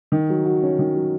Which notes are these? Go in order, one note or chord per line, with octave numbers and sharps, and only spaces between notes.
D#3
F#3
F#4
C#4
D#3
F#3